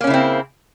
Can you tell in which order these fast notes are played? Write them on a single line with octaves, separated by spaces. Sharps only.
A#3 C#4 C#3 E4 C4